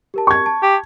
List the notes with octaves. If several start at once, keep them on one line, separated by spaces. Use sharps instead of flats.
G4 A#4 A5
C#6 G#6
A5
G4